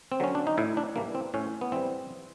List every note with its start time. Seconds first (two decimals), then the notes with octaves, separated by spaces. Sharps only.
0.12 C4
0.20 D3 F#3 C#4
0.35 D4
0.47 D#4
0.58 A2 E4
0.77 D4
0.96 E3 G3 A#3
1.15 C4
1.34 A2 C#4
1.61 B3
1.72 E3 G3 C4